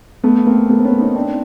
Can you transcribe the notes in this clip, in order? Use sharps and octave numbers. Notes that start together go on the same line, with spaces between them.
A3 B3
A#3 C4
A3 B3
C4
B3 C#4
C#4 D#4
C4 D4